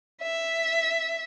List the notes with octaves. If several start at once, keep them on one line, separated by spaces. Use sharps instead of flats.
E5